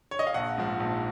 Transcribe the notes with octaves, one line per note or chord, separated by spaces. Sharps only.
C#5
D#5
F5
A#1 F#5
G#2 F3
A#1